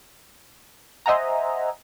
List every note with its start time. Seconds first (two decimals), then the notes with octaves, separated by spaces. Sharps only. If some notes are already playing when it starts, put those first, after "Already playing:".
1.06 C5 D#5 E5 F#5 G#5 A#5